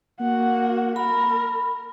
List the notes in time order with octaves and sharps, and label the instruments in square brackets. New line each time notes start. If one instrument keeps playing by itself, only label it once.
[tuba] A#3 [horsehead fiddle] F#4 F#5
[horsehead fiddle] A#4 [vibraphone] B5